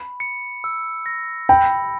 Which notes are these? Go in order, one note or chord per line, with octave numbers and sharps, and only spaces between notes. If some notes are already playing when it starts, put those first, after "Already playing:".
Already playing: B5
C#7
E6
A#6
G5 B5